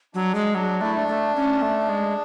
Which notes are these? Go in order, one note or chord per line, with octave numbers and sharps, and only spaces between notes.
F#3 D4
G#3
F#3 D4
A3 E4
D4
A3
C#4
A3
G#3